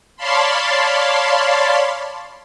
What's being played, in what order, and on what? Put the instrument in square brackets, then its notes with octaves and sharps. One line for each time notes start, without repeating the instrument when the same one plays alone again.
[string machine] C#5 D5 F5 A5 B5 C6